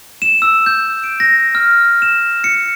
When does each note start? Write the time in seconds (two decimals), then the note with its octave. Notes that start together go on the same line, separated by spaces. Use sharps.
0.22 E7
0.42 E6
0.66 G6
1.04 D7
1.20 A#6
1.55 F6
2.02 E7
2.44 C#7